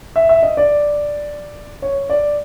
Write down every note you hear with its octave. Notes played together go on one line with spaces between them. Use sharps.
E5
E5
D#5
D5
C#5
D5